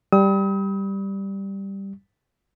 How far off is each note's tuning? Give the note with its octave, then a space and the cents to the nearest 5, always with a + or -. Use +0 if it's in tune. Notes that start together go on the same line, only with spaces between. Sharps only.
G3 +0 D#6 +45